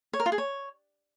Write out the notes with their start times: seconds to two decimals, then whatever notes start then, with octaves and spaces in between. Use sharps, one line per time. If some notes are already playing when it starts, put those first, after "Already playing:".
0.13 C#5
0.20 A#4
0.26 F4
0.32 G#4
0.38 C#5